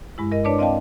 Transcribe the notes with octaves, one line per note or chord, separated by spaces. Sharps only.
G2 G#3 E4
A#4 D#5
D4 B4 C#5 D5 A5 D6
C4 D5 D#5 F5 G5 A5